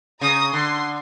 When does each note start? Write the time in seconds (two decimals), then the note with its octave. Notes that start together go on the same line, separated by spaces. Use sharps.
0.21 C#3 A#5 D#6
0.53 D3 C6